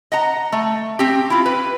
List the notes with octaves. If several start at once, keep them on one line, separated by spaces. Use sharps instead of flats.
D#5 F#5 A#5
A3
C4 G4
E4 F4
B4